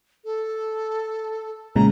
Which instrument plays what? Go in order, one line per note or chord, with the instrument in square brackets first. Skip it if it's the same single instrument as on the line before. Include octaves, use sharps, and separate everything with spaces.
[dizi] A4
[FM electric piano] A#2 C#3 G#3 [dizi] A#5